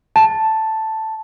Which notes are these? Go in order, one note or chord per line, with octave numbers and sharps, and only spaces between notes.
A5